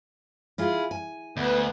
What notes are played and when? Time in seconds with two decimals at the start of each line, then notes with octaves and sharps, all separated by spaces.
0.58 E4 F4 G#4
0.91 G#5
1.37 D2 B3